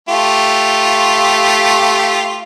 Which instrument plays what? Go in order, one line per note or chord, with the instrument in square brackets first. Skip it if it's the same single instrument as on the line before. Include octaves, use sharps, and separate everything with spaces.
[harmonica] A3 F4 G4